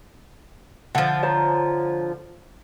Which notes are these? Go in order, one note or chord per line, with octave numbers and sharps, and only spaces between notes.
D3 F3 F#5
C5 C#5 A#5